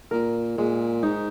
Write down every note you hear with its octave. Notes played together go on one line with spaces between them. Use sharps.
A#2 A#4
A#2 G#3
G#2 D#4